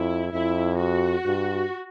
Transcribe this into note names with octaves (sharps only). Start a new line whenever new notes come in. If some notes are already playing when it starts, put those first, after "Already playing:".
Already playing: F2 E4
F2 E4
F#4
G2